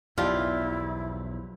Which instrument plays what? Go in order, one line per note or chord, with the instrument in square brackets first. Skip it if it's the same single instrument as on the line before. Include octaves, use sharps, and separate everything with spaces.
[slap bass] B1 E2 [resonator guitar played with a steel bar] F3 G4 D5 [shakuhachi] E4 [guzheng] F4